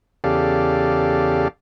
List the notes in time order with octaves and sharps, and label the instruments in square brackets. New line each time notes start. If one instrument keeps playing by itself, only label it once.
[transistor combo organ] E2 C#3 G4 A4 D5 F5